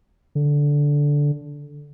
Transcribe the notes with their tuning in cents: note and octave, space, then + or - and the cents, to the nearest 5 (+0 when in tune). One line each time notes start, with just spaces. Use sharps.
D3 -10